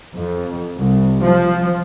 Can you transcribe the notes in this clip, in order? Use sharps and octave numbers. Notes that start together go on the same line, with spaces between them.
F2
C2
F3